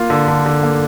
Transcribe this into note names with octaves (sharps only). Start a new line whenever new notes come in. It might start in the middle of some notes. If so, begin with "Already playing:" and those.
Already playing: A#3 F4
D3
D3
D3
A#3